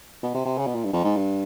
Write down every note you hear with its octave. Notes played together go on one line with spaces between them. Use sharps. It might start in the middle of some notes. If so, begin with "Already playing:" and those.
B2
C3
C3
C#3
B2
A#2
G2
F2
G#2
G2